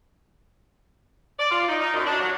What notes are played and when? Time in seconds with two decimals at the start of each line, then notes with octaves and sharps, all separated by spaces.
1.39 D5
1.51 F4
1.68 D#4
1.81 D#4
1.94 F#2
2.07 D4
2.20 F#3